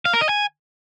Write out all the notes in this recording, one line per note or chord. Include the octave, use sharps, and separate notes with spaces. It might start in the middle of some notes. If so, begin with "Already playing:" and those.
F5
A#4
D#5
G#5